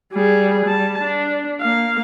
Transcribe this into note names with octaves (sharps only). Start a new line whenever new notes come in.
G3 G#4
G3 A5
D4
A#3 F5